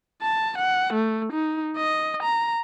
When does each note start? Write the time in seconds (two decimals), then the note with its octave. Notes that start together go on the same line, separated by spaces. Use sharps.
0.22 A5
0.58 F#5
0.93 A3
1.32 D#4
1.77 D#5
2.23 A#5